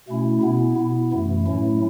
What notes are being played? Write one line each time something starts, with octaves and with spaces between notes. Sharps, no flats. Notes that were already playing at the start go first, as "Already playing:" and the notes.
B2 A3 C#4 E4
B2 B3 E4
B2 B3 E4
F#2 E3 A3
A2 F#3 A3 C#4 E4